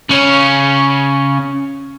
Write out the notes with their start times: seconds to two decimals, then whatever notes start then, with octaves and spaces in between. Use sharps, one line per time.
0.09 C#3 C#4